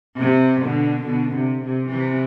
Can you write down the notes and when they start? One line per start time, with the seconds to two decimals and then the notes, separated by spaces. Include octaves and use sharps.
0.19 C3
0.62 B2 D3
1.05 B2 D3
1.34 C3
1.62 C3
1.91 C3 E3